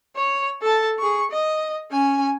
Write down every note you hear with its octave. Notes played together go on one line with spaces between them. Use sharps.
C#5
A4 A5
G#4 C#6
D#5
C#4 G#5